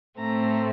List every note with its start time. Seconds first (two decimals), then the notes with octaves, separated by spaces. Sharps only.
0.18 A2 A3 C4 A#5